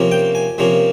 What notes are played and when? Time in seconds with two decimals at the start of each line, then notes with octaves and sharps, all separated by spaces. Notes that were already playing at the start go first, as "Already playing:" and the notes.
Already playing: C3 F3 A#3 C#4
0.11 G5
0.35 G#5
0.58 C3 F3 A#3 C#4